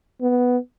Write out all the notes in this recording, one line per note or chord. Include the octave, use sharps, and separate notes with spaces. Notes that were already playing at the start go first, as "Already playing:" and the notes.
B3